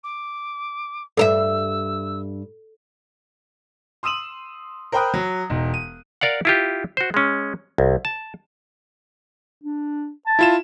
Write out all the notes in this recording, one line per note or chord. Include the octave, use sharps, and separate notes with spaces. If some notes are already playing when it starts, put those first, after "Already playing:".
D6
G2 A4 A#4 E5 E6
C6 D#6 E6 D#7 E7 F#7
A#4 C5 G5 B5 D#6 F#6
F#3
E1 D#4
D#7
A#4 D5 F5 F#5
E4 F4 G4
F#4 C5
G#3 C#4
C2
A5
D4
A5
E4 F4 E7